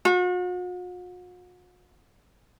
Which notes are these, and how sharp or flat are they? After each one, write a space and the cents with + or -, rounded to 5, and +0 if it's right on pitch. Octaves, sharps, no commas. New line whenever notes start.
F#4 -45